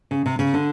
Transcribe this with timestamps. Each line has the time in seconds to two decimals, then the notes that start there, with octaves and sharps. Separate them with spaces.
0.11 C#3
0.26 C3
0.39 C#3
0.54 D3